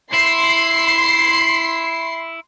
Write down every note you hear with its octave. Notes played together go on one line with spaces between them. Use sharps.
E4 C6 C7